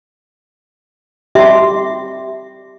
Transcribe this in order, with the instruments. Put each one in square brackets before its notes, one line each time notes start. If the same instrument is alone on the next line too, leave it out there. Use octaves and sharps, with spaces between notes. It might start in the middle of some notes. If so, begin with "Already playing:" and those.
[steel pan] G4 C6 [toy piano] E5